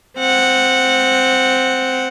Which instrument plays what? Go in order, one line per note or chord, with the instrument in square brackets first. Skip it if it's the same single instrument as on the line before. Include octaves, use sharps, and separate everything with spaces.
[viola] C4 F#5